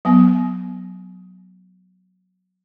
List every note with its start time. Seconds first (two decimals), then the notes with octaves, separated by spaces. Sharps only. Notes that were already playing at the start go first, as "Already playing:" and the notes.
0.05 F#3 B3